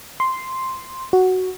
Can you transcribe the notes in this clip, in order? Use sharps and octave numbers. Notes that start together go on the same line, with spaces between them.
C6
F#4